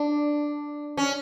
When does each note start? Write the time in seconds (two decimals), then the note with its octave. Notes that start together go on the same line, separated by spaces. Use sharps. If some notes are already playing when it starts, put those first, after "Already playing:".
Already playing: D4
0.97 C#4